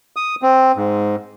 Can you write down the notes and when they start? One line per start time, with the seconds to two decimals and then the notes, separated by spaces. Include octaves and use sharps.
0.16 D#6
0.42 C4
0.76 G#2